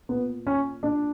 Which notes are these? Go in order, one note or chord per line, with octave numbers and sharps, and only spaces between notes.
A#2 B3
C#4
A#2 D4